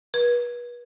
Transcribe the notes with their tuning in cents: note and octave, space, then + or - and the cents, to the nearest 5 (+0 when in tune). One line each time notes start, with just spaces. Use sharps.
B4 -35